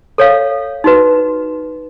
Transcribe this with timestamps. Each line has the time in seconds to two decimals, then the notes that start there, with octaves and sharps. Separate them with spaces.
0.18 A4 C#5 F5
0.84 D#4 F#4 B4